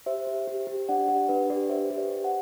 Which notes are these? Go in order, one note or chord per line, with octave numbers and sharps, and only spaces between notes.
G4 C5 E5
G4
G4
G4
D4 D5 F#5
G4 D5 F#5
D4 B4
G4 B4 D5
G4 C5 E5
G4
B4 D5
G4
D5 F#5